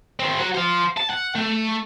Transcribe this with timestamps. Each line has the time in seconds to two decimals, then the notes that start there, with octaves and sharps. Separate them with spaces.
0.20 D#3 C4
0.39 F#3 F#5
0.55 C5 F5
0.98 A5
1.11 F#5
1.36 A3